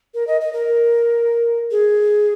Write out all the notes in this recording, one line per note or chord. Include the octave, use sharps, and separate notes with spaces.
A#4
D#5
D#5
A#4
G#4